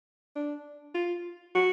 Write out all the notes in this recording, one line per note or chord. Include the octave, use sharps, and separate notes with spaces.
D4
F4
F#4